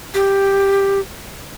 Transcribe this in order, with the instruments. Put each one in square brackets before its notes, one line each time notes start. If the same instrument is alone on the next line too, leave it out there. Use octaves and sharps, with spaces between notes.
[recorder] G4